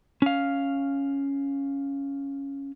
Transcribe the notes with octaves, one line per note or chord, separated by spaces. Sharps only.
C#4 F5